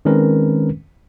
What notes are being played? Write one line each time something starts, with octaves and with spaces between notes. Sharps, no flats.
D#3 G#3 C4 C#4 A#4 B4